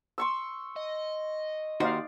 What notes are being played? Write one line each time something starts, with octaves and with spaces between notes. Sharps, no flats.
C6 C#6 E6
D#5
D#2 D#4 F#4 C5 D5 F5